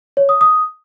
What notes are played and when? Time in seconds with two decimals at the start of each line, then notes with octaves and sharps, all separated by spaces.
0.17 C#5
0.29 D#6
0.41 D#6